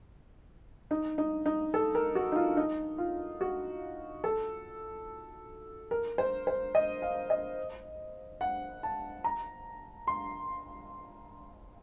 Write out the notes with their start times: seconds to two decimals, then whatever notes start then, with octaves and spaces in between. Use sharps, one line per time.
0.91 D#4
1.18 D#4
1.46 D#4
1.74 A4
1.95 A#4
2.15 F#4
2.32 D#4
2.36 F4
2.57 D#4
2.98 F4
3.41 F#4
4.24 A4
5.91 A#4
6.18 C5
6.47 C5
6.75 D#5
7.02 F5
7.30 D#5
8.41 F#5
8.83 A5
9.24 A#5
10.07 C6